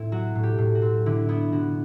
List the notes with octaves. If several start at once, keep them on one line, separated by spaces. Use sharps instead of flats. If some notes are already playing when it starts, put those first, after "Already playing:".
Already playing: A2 C4 E4
F#3 F#4
A2
G4
A2
F#4
C4
D3 E4
B3 E4
D3 F#4